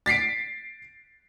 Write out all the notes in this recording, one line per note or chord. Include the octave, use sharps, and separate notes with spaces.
A6 B6 C7 D7